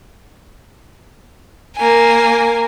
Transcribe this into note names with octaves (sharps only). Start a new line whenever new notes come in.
A#3 G#5